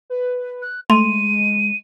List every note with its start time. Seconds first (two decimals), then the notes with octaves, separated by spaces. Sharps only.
0.10 B4
0.62 F#6
0.90 G#3 A3 C6 D#7